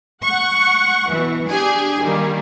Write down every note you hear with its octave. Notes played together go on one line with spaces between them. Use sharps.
F#5 C#6
B2 E3
D4 G4 G#4 G#5
D#3 G3 A#3